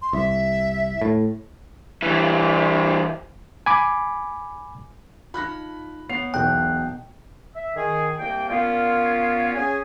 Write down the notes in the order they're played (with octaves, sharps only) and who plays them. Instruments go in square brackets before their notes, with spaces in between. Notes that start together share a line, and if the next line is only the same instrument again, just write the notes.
[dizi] C6
[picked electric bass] C2 [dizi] E5
[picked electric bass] A2
[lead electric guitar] E3 G3
[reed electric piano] G#5 B5 D6
[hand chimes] D#4 F4 [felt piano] B5 F#6 A#6
[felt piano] B3 [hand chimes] C#5 [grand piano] C7 F7
[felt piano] E1 [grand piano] B1 B2 [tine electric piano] G5 [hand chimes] F#6 G6
[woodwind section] E5
D#3 G#4
C2 A#3 G5
A#2 B3 C#4 F4
C#4 G#4 G#5